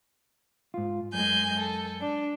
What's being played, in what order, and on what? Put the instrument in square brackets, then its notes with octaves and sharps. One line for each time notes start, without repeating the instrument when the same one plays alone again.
[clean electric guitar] G#2 F4
[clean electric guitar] F#2 [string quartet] G#3 G#5 G6
[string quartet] A4
D4